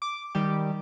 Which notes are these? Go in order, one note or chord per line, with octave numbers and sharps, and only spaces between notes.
D6
D#3 G3 G4